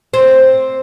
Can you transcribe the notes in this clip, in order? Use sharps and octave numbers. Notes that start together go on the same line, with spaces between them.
C4